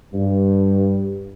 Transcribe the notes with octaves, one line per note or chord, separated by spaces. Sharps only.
G2